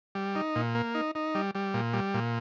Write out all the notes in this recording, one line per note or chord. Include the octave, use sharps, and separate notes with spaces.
G3
D#4
A#2
A#3
D#4
D#4
G3
G3
A#2
G3
A#2